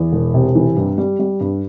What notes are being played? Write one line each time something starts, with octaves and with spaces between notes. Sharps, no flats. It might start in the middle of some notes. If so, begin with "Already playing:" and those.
Already playing: E2
E1
C3
E3
G2
G3
G3
G2